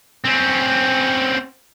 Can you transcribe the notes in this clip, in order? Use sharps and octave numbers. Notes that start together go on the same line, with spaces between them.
C4 C#4